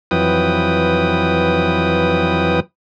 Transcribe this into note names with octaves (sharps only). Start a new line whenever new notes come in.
F2 E3 F#3 B4 G5 D#6